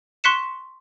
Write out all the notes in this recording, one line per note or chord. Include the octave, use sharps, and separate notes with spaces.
C6 C#6 F#6 B6 C#7 E7